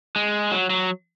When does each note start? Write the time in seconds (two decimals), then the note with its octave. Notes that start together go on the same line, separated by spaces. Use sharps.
0.16 G#3
0.51 F#3
0.70 F#3